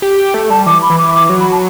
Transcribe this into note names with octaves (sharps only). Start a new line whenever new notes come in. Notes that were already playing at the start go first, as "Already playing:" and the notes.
G4
A3
G3 A5
E3 D6
B5
E3
D6
D6
F#3
B5
A5